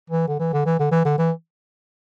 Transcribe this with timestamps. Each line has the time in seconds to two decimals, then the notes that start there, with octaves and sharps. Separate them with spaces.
0.10 E3
0.28 D3
0.40 E3
0.53 D3
0.66 E3
0.80 D3
0.92 E3
1.05 D3
1.18 E3